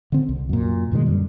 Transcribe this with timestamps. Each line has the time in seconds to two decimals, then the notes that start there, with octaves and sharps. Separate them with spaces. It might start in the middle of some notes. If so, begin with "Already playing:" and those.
0.12 D3 C4
0.29 C2
0.49 F#2 A#2
0.92 G2 B2 D#3 G#3
1.06 F#2 D3 G3